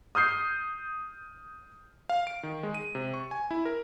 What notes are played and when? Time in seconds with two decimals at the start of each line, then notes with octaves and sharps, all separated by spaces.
0.15 D#6 F6 G6 C7
2.09 F5
2.27 D7
2.43 D#3
2.63 G#3
2.74 D#7
2.95 C3
3.14 C#6
3.31 G#5
3.51 E4
3.65 A#4